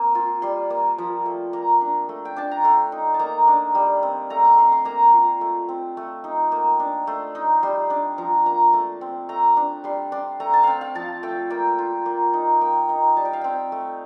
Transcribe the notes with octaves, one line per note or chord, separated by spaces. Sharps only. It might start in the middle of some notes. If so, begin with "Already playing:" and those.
Already playing: A#3 C4
F4
G3 C6
A#3
F3
A3
A#3 A#5
D4
A3
G5
D4 A5
A#5
A3 C6
D#4
A5
A#3 A#5
D4
G3
C4
A3 A#5
A#5
C4 C6
C6
A#3 A#5
F4
A3
C4
A3
D#4
A#3
D4
A3 C6
D#4
G3 C6
D4
F3 A#5
A#3 A#5
A3 A5
C4
A3 A#5
D4
G3 C6
D4 C6
A3 A#5
A5
C4 F5 G5
F5
F3 A5
A3 G5
A#3 G5
F4
A#3
D#4
A#3 G5
D#4
G3 A5
G5
F5
C4 G5
A3